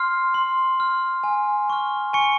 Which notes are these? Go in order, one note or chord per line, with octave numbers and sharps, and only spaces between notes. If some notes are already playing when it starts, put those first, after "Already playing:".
Already playing: C6 F6 C7
C6
F6
G#5
C#6 F6
G#5 C#6 C#7